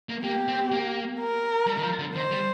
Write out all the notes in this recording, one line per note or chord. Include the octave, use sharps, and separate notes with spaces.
A#3
A#3 G4
C4
A#3
A#4
G3
D#3
F3
D3
D#3 C5
G3